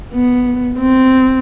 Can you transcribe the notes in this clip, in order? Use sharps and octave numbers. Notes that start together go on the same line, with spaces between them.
B3
C4